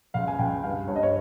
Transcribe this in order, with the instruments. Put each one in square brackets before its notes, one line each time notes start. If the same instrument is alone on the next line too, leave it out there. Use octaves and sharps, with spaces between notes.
[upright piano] C#2 F5
G#5
C#2 G5
G2 F5
G2 C#5
D#5
C#5